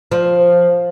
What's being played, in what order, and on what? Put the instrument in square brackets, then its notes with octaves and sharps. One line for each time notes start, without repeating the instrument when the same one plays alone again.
[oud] F3